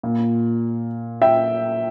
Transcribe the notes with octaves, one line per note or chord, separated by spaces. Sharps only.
A#2
E5 G5